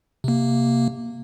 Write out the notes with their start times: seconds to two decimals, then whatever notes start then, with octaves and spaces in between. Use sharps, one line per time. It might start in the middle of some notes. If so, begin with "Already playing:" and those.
0.24 C3 A#3